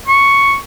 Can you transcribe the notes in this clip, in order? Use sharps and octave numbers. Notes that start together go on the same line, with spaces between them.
C#6